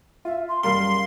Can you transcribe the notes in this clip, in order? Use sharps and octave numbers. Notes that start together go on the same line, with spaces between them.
F4 E5
C6
F#1 G3 A#4 F5 C6